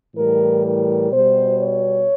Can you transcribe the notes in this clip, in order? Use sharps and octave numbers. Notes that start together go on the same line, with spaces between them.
A2 E3 G3 A#4
A#4
B2 G3 C5
C#5